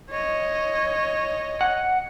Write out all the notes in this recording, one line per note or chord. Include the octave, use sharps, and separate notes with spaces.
C#5 D#5
F#5